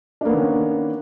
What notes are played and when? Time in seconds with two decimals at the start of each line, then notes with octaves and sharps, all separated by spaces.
0.21 D4
0.25 A#3
0.29 B3
0.33 D#3
0.37 C#4